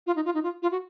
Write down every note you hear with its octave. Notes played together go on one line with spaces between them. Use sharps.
F4
D#4
F4
D#4
F4
F4
F#4